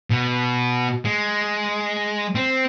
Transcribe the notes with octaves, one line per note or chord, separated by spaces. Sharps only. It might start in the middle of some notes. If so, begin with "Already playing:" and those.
B2
G#3
C4